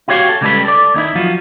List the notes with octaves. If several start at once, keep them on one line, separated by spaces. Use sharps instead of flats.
E4 F#4 G4 C#5 F5
A4
C#3 G3 G#3 G4 A4 B4
A4 D5
D#2 D#4 E4
F3 F#3 F4